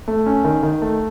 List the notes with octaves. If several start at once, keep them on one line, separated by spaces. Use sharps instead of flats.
A3
C#4
D#3
D#3
A3